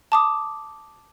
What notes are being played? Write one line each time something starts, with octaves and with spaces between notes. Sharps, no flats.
A5 D6 D#6